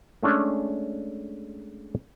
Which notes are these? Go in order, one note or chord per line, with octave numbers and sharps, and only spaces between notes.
G#3 A3 C#4 D4